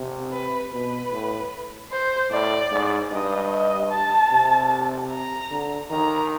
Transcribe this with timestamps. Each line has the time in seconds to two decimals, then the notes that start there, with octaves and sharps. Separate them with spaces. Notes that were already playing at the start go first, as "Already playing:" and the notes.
Already playing: C3
0.33 B4
0.72 B2 B4
1.12 A2
1.91 C5
2.31 A2 D5
2.71 G#2
3.11 G2 D#5
3.52 D#5
3.91 A5
4.32 C3
5.11 A#5
5.51 D3
5.90 D#3 A#5